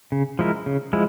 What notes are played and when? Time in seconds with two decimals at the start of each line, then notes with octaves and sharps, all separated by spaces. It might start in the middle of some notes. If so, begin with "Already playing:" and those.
0.12 C#3
0.39 F3 G#3 E4 A#4
0.66 C#3
0.93 F3 G#3 E4